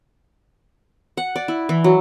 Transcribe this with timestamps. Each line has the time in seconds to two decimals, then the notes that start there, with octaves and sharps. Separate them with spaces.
1.17 F#5
1.36 D5
1.48 E4
1.69 E3
1.84 F#3